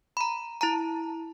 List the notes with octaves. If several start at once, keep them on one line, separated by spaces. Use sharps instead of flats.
A#5 B5
E4 A5 A#5